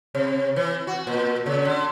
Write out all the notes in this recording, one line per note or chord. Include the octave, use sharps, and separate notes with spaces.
C3
E3
F#4
A#2
C#3
D3